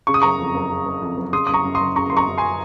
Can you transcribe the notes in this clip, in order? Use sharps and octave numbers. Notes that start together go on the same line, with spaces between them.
C#3 C#6
D#6
F#1 A#5 C#6
F2
F#1
C#3
F#1
F2
F#1
C#3 C6 D#6
D#6
F#1 A#5 C#6
F#2
C6 D#6
F#1
C#3 A#5 C#6
F#1 C6
A#5 C#6
F#2
G#5 C6